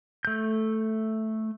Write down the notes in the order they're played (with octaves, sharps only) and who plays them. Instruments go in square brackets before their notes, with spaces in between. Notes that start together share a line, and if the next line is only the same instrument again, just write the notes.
[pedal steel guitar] A3 G6